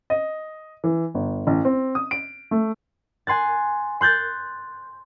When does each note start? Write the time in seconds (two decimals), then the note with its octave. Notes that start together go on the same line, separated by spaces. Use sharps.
0.10 D#5
0.84 E3
1.14 G1
1.47 A1
1.65 C4
1.95 D#6
2.11 D7
2.51 A3
3.27 G#5 C6 F#6 A6
4.01 C6 F#6 G6 A6